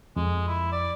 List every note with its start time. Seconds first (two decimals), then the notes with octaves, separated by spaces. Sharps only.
0.16 F2 G#3
0.48 E4
0.72 D5